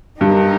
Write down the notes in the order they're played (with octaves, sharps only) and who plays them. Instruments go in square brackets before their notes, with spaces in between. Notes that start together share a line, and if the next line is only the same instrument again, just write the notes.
[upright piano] G2 [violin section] D#4 G4 A#4